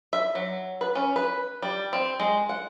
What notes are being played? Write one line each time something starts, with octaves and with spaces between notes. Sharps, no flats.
E5
F#3
B4
C#4
B4
G3
C4
G#3
F#5